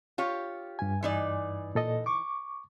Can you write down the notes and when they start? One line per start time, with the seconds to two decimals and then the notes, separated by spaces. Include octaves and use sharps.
0.18 F4 G4 C#5
0.79 G2 G#5
1.03 E3 D#4 D5
1.75 A#2 A4 D#5
2.06 C#6 D6